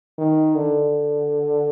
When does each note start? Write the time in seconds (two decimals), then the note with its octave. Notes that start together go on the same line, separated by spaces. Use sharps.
0.18 D#3
0.55 D3